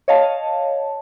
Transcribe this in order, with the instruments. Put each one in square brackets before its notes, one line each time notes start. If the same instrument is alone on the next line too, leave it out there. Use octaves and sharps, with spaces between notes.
[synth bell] C#5 D#5 F5 A5